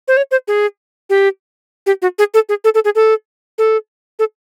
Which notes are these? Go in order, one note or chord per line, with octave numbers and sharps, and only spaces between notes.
C5
C#5
C5
G#4
G4
G4
F#4
G#4
A4
G#4
A4
A4
G#4
A4
A4
A4